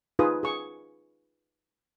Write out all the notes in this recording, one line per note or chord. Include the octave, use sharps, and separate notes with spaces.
D#4 F4 G#4 B4 D#6
G#4 C#6